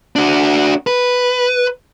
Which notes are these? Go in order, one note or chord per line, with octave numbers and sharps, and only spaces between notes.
D4 F#4
B4